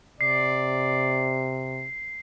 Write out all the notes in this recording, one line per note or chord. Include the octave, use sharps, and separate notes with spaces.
C3 D5 C7